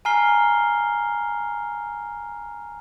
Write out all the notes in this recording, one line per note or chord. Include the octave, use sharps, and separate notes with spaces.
G#5 A#5 F6 C7 G7